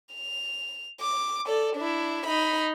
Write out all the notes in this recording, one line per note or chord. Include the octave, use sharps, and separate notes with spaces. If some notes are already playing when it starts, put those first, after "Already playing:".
F7
D6
A4 D5
D4 E4
D#4 B5